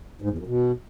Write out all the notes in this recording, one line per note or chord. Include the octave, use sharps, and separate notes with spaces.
G#2
E2
F#2
B2